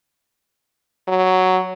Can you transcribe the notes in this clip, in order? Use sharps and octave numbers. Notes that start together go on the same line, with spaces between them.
F#3